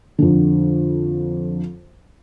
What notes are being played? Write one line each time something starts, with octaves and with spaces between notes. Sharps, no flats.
F2 D3